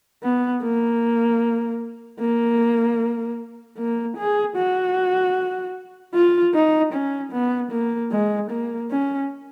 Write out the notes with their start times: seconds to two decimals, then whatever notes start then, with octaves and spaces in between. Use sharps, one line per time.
0.23 B3
0.63 A#3
2.20 A#3
3.78 A#3
4.17 G#4
4.56 F#4
6.14 F4
6.54 D#4
6.93 C#4
7.32 B3
7.72 A#3
8.12 G#3
8.51 A#3
8.91 C#4